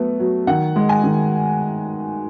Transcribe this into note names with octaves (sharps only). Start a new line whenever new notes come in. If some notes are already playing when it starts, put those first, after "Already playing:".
Already playing: F#3 A3 B3
F#3
D#3 F#5
G#3
G#5
D#3